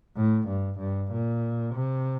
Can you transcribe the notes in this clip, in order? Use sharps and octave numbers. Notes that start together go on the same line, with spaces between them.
A2
G2
G2
A#2
C3